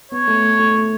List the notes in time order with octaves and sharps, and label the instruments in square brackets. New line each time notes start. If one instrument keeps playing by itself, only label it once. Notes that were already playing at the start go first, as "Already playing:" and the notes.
[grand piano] B3 [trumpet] C#5
[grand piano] A3
A3
A3